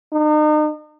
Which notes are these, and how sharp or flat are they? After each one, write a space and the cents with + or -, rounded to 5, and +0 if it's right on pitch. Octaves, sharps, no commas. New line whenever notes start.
D#4 -40